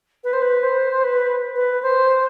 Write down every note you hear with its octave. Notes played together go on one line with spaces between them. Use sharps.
B4
C5
B4
C5
B4
B4
C5